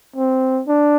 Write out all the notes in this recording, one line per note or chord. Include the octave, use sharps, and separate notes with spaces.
C4
D4